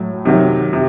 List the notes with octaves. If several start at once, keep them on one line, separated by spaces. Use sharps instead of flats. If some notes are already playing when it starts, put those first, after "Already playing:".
Already playing: A2 F#3
C3 D#3 F#3
C3